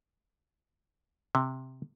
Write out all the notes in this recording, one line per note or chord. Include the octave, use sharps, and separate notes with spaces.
C3